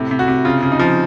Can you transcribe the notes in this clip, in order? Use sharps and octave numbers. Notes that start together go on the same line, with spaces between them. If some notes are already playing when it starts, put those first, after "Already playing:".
Already playing: A2 C3
C3
F#4
C3
C#3 F4
C#3
D#4
F3